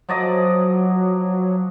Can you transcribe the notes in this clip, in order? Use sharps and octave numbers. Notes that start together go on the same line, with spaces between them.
F3 F#3 D5 D#5